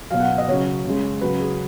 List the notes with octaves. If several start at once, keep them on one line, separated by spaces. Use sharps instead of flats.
B2 F#3 F5
F#5
D#5
C#3 F#3 C#5
C#3 G#3
C#3 F#3 B4
G#4